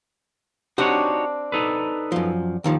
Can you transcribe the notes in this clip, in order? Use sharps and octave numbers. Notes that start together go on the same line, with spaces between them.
C4 D4 D#4 F#4 G4 C#5 F#5
D#4 A4 B4
F#2 F3
D#2 D#3 F3